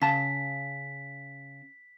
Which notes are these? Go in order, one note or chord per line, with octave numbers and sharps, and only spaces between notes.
C#3 A5 B6